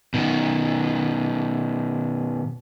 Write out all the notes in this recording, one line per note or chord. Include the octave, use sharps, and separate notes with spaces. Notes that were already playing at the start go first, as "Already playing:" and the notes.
B2 D#3